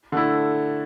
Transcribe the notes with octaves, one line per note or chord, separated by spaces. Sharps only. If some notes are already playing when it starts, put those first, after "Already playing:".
D3 A3 E4